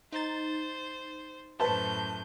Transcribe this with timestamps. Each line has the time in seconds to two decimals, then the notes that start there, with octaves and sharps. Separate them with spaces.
0.12 D#4 C5 A6
1.60 F#2 A2 B4 C5 A5 G6